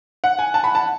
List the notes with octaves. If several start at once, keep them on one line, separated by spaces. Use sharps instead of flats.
F#5
G#5
A5
B5
A5